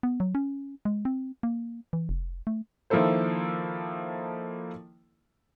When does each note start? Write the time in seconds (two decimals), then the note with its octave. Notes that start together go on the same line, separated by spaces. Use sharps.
0.03 B3
0.20 F#3
0.35 C#4
0.85 G#3
1.05 C4
1.43 A#3
1.93 E3
2.09 F1
2.47 A3
2.90 D#3 F3 A#3 E4 A4 C5